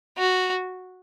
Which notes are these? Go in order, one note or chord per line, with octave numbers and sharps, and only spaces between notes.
F#4